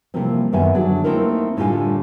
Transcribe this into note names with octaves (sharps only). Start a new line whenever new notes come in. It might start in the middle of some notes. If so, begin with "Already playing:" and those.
C3 E3 F3 G3 A#3 C4
F#2 D#3 B3 E5 G#5
D3 F#3 D4 F#4 G#4
A3 A#3 C4 D#4 E4 A#4
A2 D3 G3 A3 F4 G#5